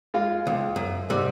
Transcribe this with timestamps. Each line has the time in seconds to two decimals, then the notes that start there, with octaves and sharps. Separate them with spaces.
0.14 G#3 F4 F5
0.47 C#2
0.76 F#2
1.10 G#2 C3 G3